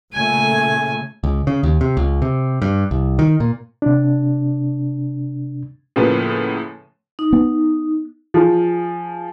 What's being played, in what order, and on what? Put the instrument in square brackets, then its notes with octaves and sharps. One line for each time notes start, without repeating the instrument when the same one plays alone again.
[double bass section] A#2 C#3 A3 [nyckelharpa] G#5
[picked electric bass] C#2
C#3
D#2
C3
C#2
C3
G2
C2
D#3
A#2
[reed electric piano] C3 D4
[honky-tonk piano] A2 C#3 F3 A#3 B3
[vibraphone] D#4
[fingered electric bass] B3
[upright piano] F3 G#4